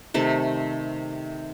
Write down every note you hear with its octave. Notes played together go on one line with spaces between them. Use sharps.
C3 D#3 A3